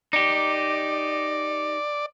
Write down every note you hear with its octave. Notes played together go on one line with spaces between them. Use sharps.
D#4 G4 D5